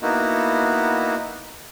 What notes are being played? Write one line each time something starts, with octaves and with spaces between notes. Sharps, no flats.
A#3 B3 D#4 E4 F#4